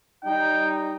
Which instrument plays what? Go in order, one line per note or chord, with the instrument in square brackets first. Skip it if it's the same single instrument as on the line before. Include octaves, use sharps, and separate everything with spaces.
[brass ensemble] G3 D#4 [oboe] G5